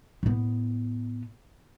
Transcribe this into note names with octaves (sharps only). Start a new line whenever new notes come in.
A2 B3